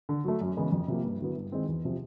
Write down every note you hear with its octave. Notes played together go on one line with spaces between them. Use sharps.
D3
F#3 A3
F#2
C#3 E3 G#3 B3
F2
C3 F3 A#3
G2
D3 F#3 B3 E4
G2
D#3 G#3 C4 E4
E2
C3 F3